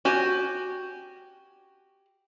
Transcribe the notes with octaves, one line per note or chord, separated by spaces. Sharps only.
F#4 G4 G#5